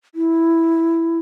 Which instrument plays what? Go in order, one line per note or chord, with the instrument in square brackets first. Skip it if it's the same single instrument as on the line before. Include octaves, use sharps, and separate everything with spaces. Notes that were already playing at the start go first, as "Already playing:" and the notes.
[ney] E4